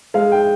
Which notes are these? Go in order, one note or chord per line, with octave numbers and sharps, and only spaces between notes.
G#3 F5
G5